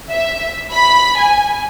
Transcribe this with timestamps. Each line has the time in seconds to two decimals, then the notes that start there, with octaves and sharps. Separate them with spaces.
0.10 E5
0.72 B5
1.16 G#5